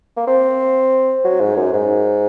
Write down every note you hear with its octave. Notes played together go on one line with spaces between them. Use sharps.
A#3
C4
F#3
G#2
F#2
G#2